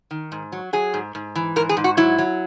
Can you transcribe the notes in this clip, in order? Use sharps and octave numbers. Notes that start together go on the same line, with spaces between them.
D#3
G#2
F#3
F#3 G#4
G#2
G#2
E3
G#2 A#4
G#4
G#2
F#4
F#3 E4
F#3